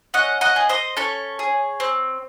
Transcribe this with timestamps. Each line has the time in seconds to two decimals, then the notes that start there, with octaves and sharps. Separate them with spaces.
0.14 C#4 D#5 F#5
0.41 D#5 F#5
0.56 G#4
0.69 C5 D#5
0.97 C#4 A4 C#5
1.39 G#4
1.80 C4